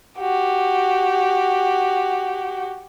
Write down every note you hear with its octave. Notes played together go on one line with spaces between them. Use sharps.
F#4 G4